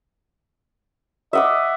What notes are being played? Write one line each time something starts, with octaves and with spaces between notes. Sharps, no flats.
D#5 E5 F#5 D6